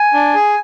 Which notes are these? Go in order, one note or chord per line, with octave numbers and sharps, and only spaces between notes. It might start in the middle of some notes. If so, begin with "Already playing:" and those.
Already playing: G#5
D4
G#4